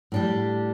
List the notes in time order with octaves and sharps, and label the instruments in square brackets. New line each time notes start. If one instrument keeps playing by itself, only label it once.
[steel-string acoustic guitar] A2 G3 D4 G4